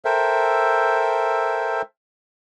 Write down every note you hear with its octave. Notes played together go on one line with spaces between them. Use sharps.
A4 A#4 C5 E5 G5